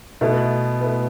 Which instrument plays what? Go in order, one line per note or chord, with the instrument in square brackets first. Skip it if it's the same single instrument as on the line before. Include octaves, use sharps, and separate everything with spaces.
[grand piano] B2 B3 [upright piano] A3 E4 A4
[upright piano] A3 E4 B4